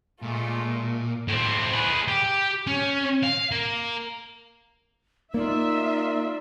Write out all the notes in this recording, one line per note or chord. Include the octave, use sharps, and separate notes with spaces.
A#2 G#3 A3 F4
A2 C4
G#4 B4
G4
C#4
F5
A#3
A#3 D#4 F4 D5 E5